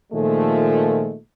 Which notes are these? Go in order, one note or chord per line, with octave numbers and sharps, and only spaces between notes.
A#2 D#3 F3 G#3 A3